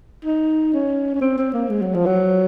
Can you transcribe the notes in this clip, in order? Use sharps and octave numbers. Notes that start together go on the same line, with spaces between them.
D#4
C#4
C#4
C4
C4
A#3
G#3
F#3
F3
F#3